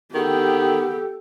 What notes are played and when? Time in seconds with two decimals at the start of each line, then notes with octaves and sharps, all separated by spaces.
0.14 D#3 B3 G4 A4